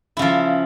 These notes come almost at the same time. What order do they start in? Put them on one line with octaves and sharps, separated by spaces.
E4 C#3 F3